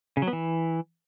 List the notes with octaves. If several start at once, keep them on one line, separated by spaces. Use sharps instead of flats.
C#3
F#3
B3
E3